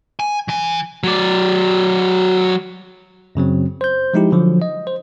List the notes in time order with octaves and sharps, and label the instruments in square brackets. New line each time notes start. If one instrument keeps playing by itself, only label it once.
[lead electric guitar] G#5
E3 G#5
[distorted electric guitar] F#3 D5
[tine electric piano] F#2 C#3 F#3 C4
C5 G6
F3 G#3 D#4 E4 G4
D3 F3 F#3
D#5
C5